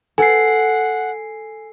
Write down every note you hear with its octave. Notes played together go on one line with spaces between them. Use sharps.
A4 F#5 G#5 C7